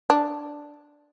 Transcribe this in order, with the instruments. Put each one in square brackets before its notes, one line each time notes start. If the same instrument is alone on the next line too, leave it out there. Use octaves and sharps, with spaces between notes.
[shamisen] D4